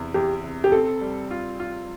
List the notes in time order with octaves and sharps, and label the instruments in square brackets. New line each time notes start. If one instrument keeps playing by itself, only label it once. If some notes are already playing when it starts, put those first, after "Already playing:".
Already playing: [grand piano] E2 C3
[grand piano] E2 [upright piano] G4
[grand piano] C3
[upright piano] G4
[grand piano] C4 [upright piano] A4
[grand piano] G3
F4
F4